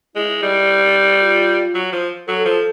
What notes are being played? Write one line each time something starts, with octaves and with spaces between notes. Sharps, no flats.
G#3 E4
G3
F4
F#3
F3
F#3 A4
F3